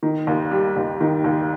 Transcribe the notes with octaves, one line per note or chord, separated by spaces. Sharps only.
D#3
D#2
G3
D#2
D#3
D#2